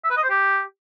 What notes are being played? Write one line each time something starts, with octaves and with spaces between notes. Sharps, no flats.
E5
B4
D#5
C5
G4